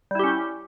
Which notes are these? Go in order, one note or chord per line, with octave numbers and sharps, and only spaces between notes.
G3 C#4 E4 G4